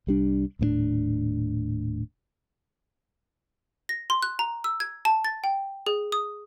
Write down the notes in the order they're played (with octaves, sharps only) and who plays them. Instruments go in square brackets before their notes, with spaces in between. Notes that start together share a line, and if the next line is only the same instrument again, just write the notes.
[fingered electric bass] C2 G3 D4
D#1 A2 A#3 D4
[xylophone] A#6
C6
F#6
A#5
E6
G#6
A5
A6
G5
G#4
D#6